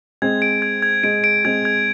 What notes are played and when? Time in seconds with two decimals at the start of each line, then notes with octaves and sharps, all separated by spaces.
0.22 G#3 C4 G#6
0.42 D7
0.62 G#6
0.82 G#6
1.03 G#3 D7
1.24 D7
1.45 G#3 C4 G#6
1.65 G#6